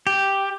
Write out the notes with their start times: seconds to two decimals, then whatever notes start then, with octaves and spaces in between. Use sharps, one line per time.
0.07 G4